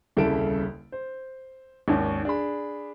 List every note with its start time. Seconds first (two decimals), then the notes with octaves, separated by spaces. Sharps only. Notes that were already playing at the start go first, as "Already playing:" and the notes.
0.17 D#1 C2 C#3 A4 E5 D7
0.92 C5
1.88 G#1 D#2 C#4
2.25 D4 G#4 B5